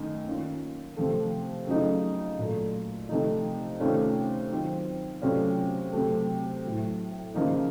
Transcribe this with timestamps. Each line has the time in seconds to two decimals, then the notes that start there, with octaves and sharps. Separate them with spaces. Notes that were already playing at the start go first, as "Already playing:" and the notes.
Already playing: F#2 D#3 A3 D#4
0.26 D#3 A#3 C#4 F4
0.97 C3 F3 A3
1.67 C#3 F#3 A3 D#4
2.38 A#2 F#3 A3
3.09 C3 F3 A3 D#4
3.80 C3 D#3 A3 C#4 F4
4.51 D#3 F#3 C4 F4
5.22 C3 F#3 A3 C#4 F4
5.93 C3 F#3 A3
6.63 A2 F#3 A3
7.34 C#3 F3 A#3 D#4